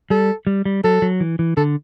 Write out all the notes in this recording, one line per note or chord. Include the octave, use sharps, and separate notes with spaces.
G3 A4
G3
G3
F#3 A4
F#3
E3
E3
D3 A4